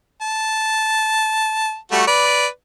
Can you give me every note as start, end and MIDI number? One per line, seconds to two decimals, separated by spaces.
0.22 1.76 81
1.92 2.03 55
1.92 2.03 57
1.92 2.03 66
2.07 2.47 71
2.07 2.47 74